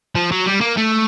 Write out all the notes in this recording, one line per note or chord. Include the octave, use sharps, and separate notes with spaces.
F3
F#3
G3
A#3
A3